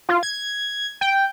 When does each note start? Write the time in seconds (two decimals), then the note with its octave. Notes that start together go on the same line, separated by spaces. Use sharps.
0.09 F4
0.23 G#6
1.01 G5